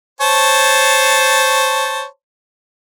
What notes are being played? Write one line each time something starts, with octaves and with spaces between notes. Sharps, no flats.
C5 C#5 A5